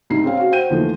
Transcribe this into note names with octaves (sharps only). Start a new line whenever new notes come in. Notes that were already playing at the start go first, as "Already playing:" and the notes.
C2 G#2 D#4 C7
C4 C#4 G#4 F5 G5
F#4 F5
C5 F#5 G5 G6 D#7
D#2 E3 F3 A3